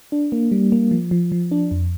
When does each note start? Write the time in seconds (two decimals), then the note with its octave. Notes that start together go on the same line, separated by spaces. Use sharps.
0.12 D4
0.32 A#3
0.52 G3
0.72 A#3
0.91 F3
1.11 F3
1.32 F3
1.51 D4
1.71 F2